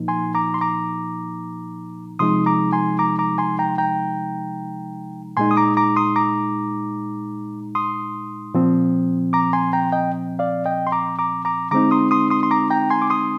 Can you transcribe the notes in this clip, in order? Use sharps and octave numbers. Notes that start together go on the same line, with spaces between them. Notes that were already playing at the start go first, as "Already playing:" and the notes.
Already playing: A#2 F3 A#3 D#4
G#5 C6
A#5 D6
C6
A#5 D6
C3 F3 G#3 D#4 C6 D#6
A#5 D6
G#5 C6
A#5 D6
A#5 D6
G#5 C6
G5 A#5
G5 A#5
A#2 G#3 D#4 G#5 C6
D#6
A#5 D6
A#5 D6
C6 D#6
A#5 D6
C6 D#6
A#2 F3 C4
A#5 D6
G#5 C6
G5 A#5
D#5 G5
D5 F5
D#5 G5
C6
A#5 D6
A#5 D6
A#5 D6
D3 G#3 C4 D#4 A#5 D6
C6 D#6
C6 D#6
C6 D#6
C6
A#5 D6
G5 A#5
G#5 C6
D6
C6 D#6